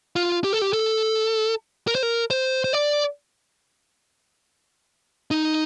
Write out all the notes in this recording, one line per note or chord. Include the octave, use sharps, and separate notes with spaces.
F4
G4
A4
G4
A4
A#4
C5
A#4
C5
C5
D5
D#4